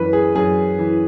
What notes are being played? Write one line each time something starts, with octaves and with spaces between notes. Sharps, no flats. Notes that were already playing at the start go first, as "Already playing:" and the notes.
Already playing: F#2 E3 B4
G#4
F#2 G#4
E3